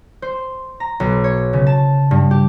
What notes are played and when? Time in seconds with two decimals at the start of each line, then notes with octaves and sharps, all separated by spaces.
0.22 C5
0.80 A#5
1.00 B1
1.24 C#5
1.53 C#3
1.67 A5
2.11 G2
2.31 G4